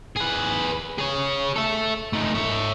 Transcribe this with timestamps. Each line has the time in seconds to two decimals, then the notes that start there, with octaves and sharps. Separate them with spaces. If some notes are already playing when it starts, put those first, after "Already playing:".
0.16 G#4 B4
0.98 G#4 C#5
1.56 A4 E5
2.13 A3 D#4
2.34 C#5 E5